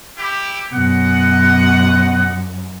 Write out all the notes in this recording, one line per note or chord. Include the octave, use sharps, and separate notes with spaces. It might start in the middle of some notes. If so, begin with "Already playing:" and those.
E4 G4
F#2 B2 D#5 F#5